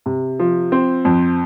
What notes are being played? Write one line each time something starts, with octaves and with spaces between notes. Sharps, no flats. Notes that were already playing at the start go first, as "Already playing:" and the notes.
C3
F3
C4
F2